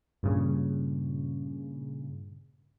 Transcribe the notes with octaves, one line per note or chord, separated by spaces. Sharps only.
G2 A#2 C#3